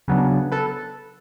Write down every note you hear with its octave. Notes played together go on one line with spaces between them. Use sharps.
C#3 F#3 B3 D4
A4 B4